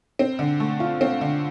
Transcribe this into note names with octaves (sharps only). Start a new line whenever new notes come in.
C4
D3
A3
F4
C4
D3